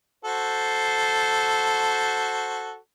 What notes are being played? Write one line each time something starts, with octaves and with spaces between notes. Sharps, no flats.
F#4 A4 C5